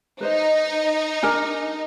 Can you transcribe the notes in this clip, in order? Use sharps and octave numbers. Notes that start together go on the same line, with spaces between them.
D#4 B4 C5 D#5
D4 A#4 G#5